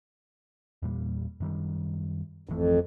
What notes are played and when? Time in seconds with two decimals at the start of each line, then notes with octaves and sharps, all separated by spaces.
0.82 E2 A#2 G3
1.40 F#2 D#3 G3
2.49 G#1 F2 E3 A3